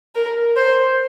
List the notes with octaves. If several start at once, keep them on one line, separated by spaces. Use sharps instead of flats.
A#4
C5